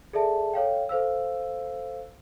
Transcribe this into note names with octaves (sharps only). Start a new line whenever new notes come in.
G#4 A4 D5 E5 A5
A4 C#5 F5 G5
A4 C5 F5 E6